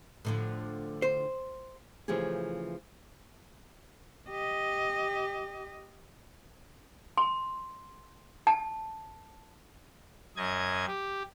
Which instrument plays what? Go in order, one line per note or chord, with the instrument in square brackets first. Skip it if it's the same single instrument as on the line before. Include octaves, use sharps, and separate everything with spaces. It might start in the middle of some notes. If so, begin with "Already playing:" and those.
[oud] A2 D3 F3
[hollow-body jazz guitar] C5
[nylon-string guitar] C#3 E3 F3 A3 G4 G#4
[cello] G4 D#5
[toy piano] C6
A5
[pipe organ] F#2 D#5 G#6
G4